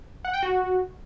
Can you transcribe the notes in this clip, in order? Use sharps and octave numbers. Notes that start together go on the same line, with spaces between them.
F#5
G5
F#4